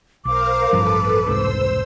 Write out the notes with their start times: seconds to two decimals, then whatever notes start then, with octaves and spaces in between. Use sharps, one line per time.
0.25 B1 A#4 C5 F5 D6
0.73 A1 G2 F3 A4 B4
1.26 E1 C2 G#2 C5 E6